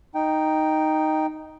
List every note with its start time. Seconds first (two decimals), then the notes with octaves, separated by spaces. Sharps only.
0.15 D#4 G5